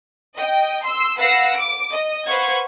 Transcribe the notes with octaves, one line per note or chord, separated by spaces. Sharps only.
D#5 G5
C6 E6
B4 F5 F#5 E6 A#6 C7
D6 D7
D#5
B4 C5 F5 F#5 C#6 G#6